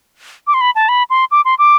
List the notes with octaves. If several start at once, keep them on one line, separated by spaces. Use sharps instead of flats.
D6
C6
B5
A5
B5
C6
D6
C6
D6